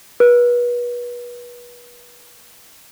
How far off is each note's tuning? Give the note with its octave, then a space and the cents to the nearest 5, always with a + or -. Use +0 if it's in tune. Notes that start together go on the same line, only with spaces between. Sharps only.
B4 -30